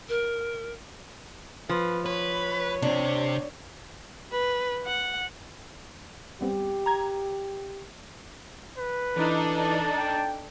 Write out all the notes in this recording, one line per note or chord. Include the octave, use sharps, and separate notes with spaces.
A#4
F3 B4
B4 C#5
C3 C4 D4
B4
F#5
G3 B3 C4 G4
A#5 G#6
B4
E3 D4 D#4 A4
A5
G5